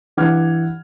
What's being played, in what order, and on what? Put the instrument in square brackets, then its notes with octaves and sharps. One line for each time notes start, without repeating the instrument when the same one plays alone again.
[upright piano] G2 E3 F#5 D6 F6 G#6